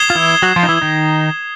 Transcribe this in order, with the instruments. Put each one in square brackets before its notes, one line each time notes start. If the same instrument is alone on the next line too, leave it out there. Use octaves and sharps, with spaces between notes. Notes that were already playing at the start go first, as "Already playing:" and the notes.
Already playing: [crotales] D#6 G#6 C7 E7 G7
[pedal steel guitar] F4
E3 E4
F#3 F#4
F3 F4
D#4
E3 E4
D#3 D#4